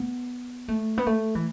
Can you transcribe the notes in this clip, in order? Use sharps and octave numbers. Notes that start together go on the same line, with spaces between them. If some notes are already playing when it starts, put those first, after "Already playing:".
Already playing: B3
A3
B3
A3
E3